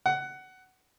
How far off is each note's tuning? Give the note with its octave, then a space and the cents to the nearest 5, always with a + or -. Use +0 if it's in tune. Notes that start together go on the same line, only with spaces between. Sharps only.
F#5 +15